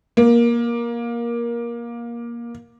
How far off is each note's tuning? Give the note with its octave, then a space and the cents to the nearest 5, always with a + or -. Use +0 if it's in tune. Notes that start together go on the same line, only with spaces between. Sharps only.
A#3 +20